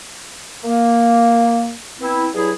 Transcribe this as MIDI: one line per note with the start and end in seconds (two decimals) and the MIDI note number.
0.65 1.74 58
2.00 2.28 59
2.00 2.28 60
2.00 2.28 64
2.34 2.51 43
2.34 2.51 54
2.34 2.51 64
2.34 2.51 68